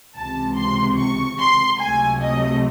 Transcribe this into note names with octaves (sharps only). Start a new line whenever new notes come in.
C#2 C3 E3 A5
C6
C#6
C6
C#2 C3 F#3 A3 G#5
D#5